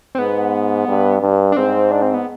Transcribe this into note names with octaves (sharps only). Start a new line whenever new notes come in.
C4
G#2 B3
G2
G2
D4
G#2 C4
D4
C4
B3